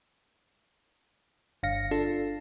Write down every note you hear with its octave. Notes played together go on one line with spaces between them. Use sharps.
G1 F5 A#6 C#7
D4 F4 A4